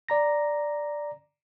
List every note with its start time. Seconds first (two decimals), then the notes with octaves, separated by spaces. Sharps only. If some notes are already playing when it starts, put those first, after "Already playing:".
0.09 D5 A#5 A#6